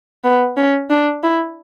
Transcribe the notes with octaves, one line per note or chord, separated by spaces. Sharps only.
B3
C#4
D4
E4